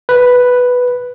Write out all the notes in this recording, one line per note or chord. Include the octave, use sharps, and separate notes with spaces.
B4